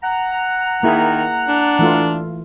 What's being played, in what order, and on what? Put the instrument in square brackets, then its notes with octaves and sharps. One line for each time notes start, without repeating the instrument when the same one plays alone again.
[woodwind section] F#5 A#5
[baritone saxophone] D#3 [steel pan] A#3 E4 G#4
[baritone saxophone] D4
[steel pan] E3 A3 F4